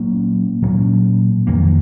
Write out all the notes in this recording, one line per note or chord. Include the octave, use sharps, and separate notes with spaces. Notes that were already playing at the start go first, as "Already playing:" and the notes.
Already playing: A#2 F#3 A#3 C#4
A#2 F#3 A#3 C#4
F2 D#3 A#3